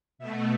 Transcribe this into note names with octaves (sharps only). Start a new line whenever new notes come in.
B2 A3 E5